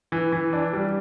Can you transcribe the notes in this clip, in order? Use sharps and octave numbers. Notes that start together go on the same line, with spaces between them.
E3
E3
D4
G3